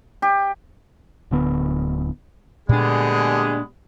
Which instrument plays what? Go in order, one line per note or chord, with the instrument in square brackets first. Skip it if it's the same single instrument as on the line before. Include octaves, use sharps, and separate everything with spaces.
[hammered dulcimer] G4
[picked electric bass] D1 D3 B3
[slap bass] A#2 D4 [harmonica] D3 G#4 [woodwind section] G3 G#3 B3